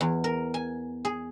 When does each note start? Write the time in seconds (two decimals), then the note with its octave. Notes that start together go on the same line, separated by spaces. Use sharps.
0.01 E2
0.24 A#4
0.54 G#5
1.05 G#4